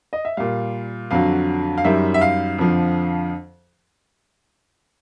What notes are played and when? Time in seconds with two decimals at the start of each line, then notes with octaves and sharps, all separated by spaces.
0.13 D#5
0.25 E5
0.37 A#2 G3 F5
1.11 F2 D3 F#3 F5
1.78 F5
1.84 F#2 D#3 G3 E5
2.14 E5
2.21 F5
2.58 F2 D3 F3